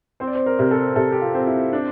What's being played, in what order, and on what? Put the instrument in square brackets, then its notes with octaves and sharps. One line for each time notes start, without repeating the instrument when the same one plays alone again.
[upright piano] C4 [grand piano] C5
[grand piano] D5
C5
A#4
[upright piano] C3 [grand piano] A#4
[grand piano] A4
[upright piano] C3 [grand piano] A4
[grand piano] G4
F4
[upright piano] C4
[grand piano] E4
D4